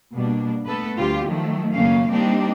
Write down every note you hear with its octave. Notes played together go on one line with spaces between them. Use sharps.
B2 G3 A#3 D4
A3 B3 A4 B4
D2 G3 F4 G4
D#3 F3 F#3 A3
F#2 C#3 A3 A#3 C#4 F5
G3 A#3 C4 D4 D#4 G4